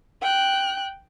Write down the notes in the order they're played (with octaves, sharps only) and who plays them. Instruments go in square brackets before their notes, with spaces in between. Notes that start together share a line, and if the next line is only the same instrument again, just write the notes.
[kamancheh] G5 F#6